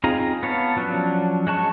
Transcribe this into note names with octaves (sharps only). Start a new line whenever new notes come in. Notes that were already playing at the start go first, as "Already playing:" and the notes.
C4 D#4 F4 G#4 A#5
B3 C#5 F5 A5
F3 F#3 C#4 D4
G#3 F#4 A5 C#6